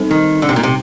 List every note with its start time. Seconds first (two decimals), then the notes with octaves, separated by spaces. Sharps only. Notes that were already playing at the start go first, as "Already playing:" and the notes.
Already playing: G3 C4 D#4 A4 C5
0.11 D#3
0.42 D3
0.49 C3
0.56 A#2
0.63 C3